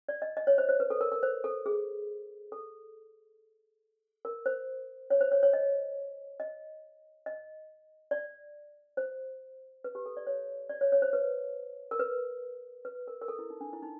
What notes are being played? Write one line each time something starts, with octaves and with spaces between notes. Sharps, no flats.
D5
D#5
D#5
C#5
C5
C5
B4
A4
A#4
A#4
C5
A4
G#4
A4
A#4
C5
C#5
C5
C#5
C#5
D#5
D#5
D#5
D5
C5
B4
G4
A4
D5
C#5
D5
C#5
C#5
C5
B4
A#4
B4
B4
A#4
A#4
A4
E4
D#4
D4
E4
D#4